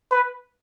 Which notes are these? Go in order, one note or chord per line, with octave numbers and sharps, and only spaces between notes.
B4